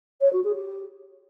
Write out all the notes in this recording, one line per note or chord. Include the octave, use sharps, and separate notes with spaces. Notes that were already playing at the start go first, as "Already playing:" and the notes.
C#5
F#4
G#4
G4